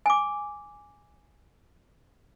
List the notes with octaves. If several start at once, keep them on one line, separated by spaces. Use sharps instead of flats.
G#5 D6